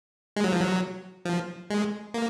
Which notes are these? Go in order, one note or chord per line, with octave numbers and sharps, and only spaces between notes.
G#3
F#3
F3
F#3
F3
G#3
A#3